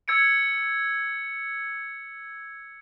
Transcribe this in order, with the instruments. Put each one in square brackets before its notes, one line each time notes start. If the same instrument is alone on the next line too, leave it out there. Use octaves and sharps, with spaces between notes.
[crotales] E6 G#6 C#7 D7